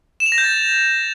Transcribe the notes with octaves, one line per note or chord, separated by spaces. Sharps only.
E7
F7
A#6
G6
A6